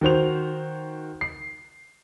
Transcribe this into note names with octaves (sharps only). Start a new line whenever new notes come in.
D#3 F#4 C5 F7
C7